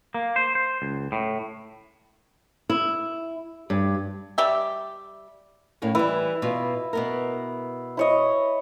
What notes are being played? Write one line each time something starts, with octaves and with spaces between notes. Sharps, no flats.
A#3
C5
C5
C#2
A2
E4
G2
G3 G4 E5
A2 A#3 C#4
E3 G3 E4
B2 F4
B2 B3 A#4
E4 C#5 D#5